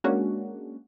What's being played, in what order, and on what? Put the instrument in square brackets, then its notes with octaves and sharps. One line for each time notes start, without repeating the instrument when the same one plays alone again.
[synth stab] G#3 A#3 C#4 D4 F#4